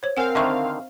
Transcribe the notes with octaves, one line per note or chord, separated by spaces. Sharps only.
C5 C#5
C4 A#4 F5 F#5 G#5
D3 D#3 D#5 E5 C#6